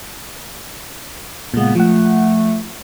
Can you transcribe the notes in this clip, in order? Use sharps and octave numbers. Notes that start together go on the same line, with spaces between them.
A#2 C#3 G#3 B3
F3 A3 F#5